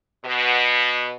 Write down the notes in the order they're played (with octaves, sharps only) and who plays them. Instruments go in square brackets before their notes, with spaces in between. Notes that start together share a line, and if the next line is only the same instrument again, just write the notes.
[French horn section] B2